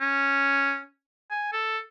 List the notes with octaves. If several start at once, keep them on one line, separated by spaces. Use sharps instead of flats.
C#4
G#5
A4